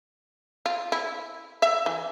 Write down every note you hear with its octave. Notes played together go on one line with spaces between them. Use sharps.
F4
E4
E5
E3